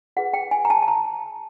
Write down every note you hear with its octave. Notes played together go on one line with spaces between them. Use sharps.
F4 G#4 B4 F#5
G5
G#5
A#5
A5
A5
A#5